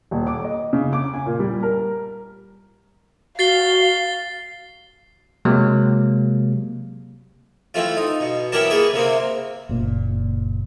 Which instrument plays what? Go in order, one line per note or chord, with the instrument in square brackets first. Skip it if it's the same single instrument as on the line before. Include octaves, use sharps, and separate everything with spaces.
[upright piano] D#1
D6
D#5
C#3
D6
G#5
A#2
G3
A#4
[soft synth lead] F#4 [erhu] F5 [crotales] A6 C7 G7
[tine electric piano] C3 F#3 G#3 A#3
[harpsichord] E3 A3 C4 F4
D#4
B2
E3 B3 G4 A#4 C#5 A5
A#3 G#4 B4 C#6
C3 A#3 C4
[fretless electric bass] F#1 A#2